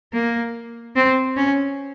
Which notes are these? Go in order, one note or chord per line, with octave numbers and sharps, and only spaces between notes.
A#3
C4
C#4